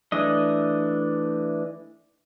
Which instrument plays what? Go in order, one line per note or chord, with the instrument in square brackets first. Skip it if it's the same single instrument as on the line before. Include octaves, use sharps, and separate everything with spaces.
[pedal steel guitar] E3 A3 D4 D#5